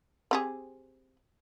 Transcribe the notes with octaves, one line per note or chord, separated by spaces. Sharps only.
C4 G4 G#4